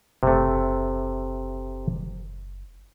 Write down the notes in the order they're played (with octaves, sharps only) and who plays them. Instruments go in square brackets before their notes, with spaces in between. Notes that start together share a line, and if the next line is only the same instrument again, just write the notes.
[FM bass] F#1 [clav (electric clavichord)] C3 A3